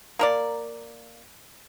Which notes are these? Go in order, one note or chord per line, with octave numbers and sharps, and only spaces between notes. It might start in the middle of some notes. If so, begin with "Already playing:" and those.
A#3 A#4 D5